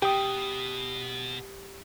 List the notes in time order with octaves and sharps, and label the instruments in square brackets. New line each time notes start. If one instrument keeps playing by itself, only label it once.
[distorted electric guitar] B2 [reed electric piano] G4 D#6 [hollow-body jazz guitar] G5